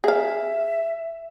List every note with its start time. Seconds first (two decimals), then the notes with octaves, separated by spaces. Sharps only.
0.04 G#4 E5 F5